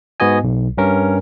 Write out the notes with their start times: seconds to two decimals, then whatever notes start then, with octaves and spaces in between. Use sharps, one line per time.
0.20 G#2 B3 F#4 D#5 G#5
0.44 B1
0.78 G2 C#4 A#4